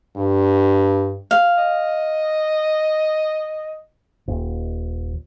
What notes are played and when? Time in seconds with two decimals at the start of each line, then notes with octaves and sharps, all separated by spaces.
0.17 G2
1.31 F5
1.57 D#5
4.28 D#1